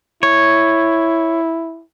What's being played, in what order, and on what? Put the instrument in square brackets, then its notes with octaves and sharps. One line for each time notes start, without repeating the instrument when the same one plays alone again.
[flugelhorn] E4 [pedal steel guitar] C#5